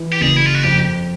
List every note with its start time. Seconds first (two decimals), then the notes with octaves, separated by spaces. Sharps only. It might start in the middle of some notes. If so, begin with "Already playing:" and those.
Already playing: E3
0.13 G4
0.21 F#1 G#4
0.36 E4
0.46 F4
0.55 F#4
0.63 F2 G4